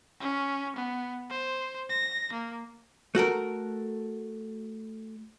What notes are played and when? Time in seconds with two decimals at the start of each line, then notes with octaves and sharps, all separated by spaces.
0.20 C#4
0.76 B3
1.30 C5
1.89 A#6
2.33 A#3
3.15 A3 F#4 A4 A#4